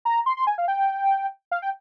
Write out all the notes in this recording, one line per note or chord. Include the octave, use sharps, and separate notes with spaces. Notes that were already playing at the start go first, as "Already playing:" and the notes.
A#5
C6
C6
G#5
F5
G5
F5
G5